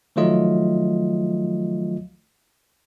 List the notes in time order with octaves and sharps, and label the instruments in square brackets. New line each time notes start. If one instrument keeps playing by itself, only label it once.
[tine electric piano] D#3 F3 F#3 A3 F4 D#5